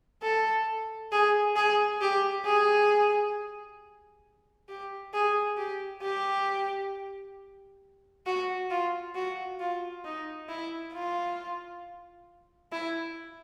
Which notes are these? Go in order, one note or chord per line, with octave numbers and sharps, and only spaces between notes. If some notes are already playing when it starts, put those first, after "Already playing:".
A4
G#4
G#4
G4
G#4
G4
G#4
G4
G4
F#4
F4
F#4
F4
D#4
E4
F4
E4